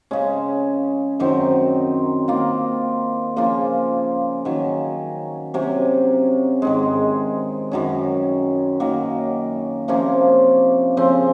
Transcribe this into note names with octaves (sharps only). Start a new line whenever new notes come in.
C#3 G#3 C#4
F#2 D#3 F#3 C4
D#3 A#3 F4
C#3 F3 A#3 F4
D#3 F#3 C#4
C3 F#3 C#4
G#2 D#3 G#3
F#2 D#3 F#3 C#4
D#3 F#3 A#3
C3 F3 A#3 C#4
C#3 F3 C4